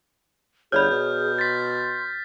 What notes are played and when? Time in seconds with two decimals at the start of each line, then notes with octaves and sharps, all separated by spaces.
0.72 G1 G#4 C#5 D5 B5 F6 G6
0.91 B2
1.39 C6 A6 B6